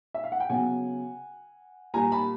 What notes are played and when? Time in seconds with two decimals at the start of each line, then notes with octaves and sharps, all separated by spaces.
0.14 E5
0.24 F5
0.32 F#5
0.40 G5
0.49 C#3 F#3 B3 F#5 G#5
1.94 A#2 G3 A#3 G#5 A#5
2.12 A5 B5